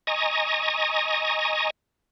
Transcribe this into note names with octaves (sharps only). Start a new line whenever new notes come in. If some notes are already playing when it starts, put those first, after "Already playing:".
D#5 G#5 A#5 C#6 D#6